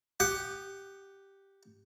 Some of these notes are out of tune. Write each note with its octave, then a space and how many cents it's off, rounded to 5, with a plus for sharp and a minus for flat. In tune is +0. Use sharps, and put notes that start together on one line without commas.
G4 +0 F#5 +10 D#6 -30